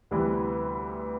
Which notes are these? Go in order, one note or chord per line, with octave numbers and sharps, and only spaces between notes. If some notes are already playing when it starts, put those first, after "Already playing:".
D2 C3 E3 G3 B3 B4